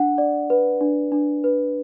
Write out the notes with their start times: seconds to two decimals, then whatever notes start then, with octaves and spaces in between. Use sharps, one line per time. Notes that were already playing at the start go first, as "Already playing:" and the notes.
Already playing: D4 F#5
0.18 D5
0.50 B4
0.81 D4
1.12 D4
1.44 B4